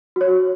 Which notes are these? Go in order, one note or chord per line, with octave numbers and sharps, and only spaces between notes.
F#4 C#5